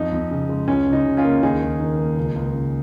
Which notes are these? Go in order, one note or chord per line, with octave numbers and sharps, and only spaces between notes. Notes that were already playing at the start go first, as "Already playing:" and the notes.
Already playing: F2 D#4
F2
C#3
G#3
C#2 C#4
C#2
D#4
C#3
C#4 F4
A#3
D#2 D#4 G#4
D#2
D#3
A#3
C#2
C#2
C#3